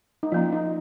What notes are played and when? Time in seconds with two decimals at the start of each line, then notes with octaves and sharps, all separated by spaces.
0.23 D#4
0.32 F3 A#3 C#4 F4
0.52 D#4